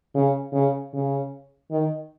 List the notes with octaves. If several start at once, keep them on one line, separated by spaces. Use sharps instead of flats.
C#3
C#3
C#3
D#3